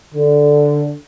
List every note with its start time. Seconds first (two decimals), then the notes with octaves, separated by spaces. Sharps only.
0.14 D3